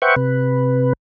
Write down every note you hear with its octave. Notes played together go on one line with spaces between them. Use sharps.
B4 C5 E5 F#5 G5 C#6
C3 B4